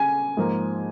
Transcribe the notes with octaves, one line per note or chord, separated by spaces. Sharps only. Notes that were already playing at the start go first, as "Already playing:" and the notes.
Already playing: C#3 G#5
G#2 F3 A#3